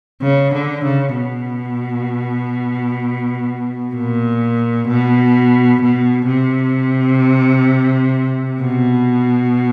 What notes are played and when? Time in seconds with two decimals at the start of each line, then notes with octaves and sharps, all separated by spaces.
0.22 C#3
0.53 D3
0.84 C#3
1.16 B2
3.95 A#2
4.88 B2
5.82 B2
6.28 C3
8.61 B2